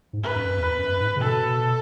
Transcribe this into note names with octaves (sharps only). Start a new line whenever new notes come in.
G#2
B4
F#2
E2
F#2
G#2
C#3
B2 A4